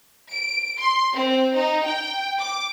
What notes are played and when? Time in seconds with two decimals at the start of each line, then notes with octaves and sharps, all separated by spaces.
0.30 D7
0.79 C6
1.13 C4
1.55 D#4
1.84 G5
2.40 D6